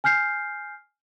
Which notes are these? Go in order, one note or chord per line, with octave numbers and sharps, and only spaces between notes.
G#5 F6 G6 C7